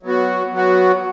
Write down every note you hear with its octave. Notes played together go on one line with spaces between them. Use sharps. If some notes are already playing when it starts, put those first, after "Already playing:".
F#3 B3 F#4
F#3 B3 F#4